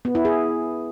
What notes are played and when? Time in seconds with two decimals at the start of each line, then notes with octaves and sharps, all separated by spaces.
0.05 B3
0.15 E4
0.25 G#4